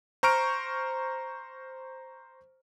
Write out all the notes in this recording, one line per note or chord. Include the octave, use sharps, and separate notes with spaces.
C5 A#5 C#6 F6 D7